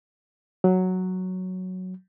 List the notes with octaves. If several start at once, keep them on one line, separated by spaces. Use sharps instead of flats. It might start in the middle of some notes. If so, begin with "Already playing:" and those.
F#3